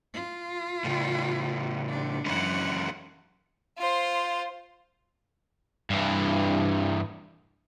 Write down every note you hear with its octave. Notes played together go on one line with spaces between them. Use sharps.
F4
A2 C#3
D4
F#2 E3 G#3 C#4 F#5
F4 C5
G2 E3